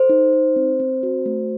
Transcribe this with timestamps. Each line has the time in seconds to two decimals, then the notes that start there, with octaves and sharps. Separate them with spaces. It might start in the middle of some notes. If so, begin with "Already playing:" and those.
Already playing: A4 C5
0.09 D#4
0.33 D#4
0.56 C4
0.80 C4
1.03 F#4
1.26 A3